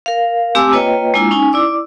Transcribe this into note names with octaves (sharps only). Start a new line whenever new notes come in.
A#4 F5
A3 C4 G4 G#5 D6 E6
A#3 F4 B4 C#5 D#5 G5
G#3 A#3 D4 E4 F4
C#4 D#4 G#5
E4 D5 D6 E6